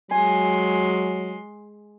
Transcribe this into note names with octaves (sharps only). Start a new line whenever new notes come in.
F#3 G#3 G#5 C6